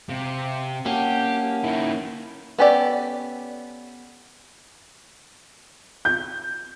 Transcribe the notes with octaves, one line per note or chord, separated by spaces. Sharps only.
C3 C4 F5
A#3 C#4 G4 F#5 G#5 A5
D#3 E4
B3 C#4 G4 A4 D5
G6